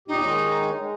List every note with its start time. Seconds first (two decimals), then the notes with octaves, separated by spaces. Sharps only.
0.08 E2 A#2 D#4 G4
0.22 D#3 G#3 C#5
0.78 G#3